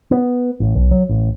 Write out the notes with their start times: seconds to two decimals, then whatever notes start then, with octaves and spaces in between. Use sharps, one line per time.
0.11 B3
0.60 A1
0.75 B1
0.91 F#3
1.09 A1